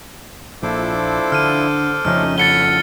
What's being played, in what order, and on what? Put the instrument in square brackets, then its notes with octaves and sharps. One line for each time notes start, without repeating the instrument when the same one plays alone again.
[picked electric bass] A#1 [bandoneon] F3 D4 E4 [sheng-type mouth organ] A4 C5 D6
[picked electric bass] D3 [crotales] F6 D#7
[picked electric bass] F2 C#3 F3 [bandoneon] A3 C#4 D#4 [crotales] F6
[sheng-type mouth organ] A4 F#5 [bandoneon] C#5 B5 F#6 [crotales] A6 C#7 G7